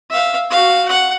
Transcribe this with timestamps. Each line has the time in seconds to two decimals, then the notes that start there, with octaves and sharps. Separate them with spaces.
0.11 E5 F5
0.50 F#4 F5
0.88 F#5